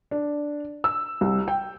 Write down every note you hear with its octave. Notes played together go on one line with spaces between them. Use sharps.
D4
E6
C2
G5